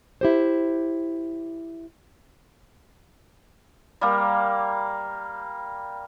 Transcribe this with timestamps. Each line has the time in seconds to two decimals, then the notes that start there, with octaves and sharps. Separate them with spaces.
0.21 E4 G4 C5
4.01 G3 A#3